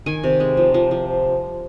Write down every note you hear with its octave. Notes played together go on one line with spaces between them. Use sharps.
D#3 G#5
C3
G#3
F3
F3
F3